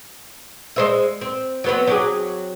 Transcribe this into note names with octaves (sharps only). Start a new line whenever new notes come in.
G#3 C5 E5
C4
F#3 B3 C4
F#3 G4 G#4